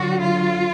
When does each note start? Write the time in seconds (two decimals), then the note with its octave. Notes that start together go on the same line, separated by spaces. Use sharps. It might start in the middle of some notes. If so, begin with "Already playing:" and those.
Already playing: D3 F#3 F#4
0.21 F4